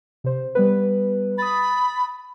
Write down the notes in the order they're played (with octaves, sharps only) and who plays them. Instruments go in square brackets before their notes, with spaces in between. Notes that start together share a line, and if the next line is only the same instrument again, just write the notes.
[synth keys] C3 C5
G3 B3 B4
[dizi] B5 [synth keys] D#6 A6